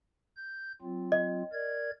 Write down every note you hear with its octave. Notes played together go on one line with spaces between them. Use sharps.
G6
F#3 C4 F4
D#5
A#4 D5 G#6